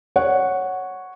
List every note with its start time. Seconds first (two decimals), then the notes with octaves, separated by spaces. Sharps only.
0.16 C#5 F#5